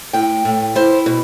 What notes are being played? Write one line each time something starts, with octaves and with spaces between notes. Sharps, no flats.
A2 G5
A2
E4 C5
B2